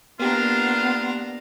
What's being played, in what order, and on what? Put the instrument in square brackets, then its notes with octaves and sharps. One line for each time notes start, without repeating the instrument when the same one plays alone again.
[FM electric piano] A#3 G4 [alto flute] B3 [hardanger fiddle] D4 A#5 [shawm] F4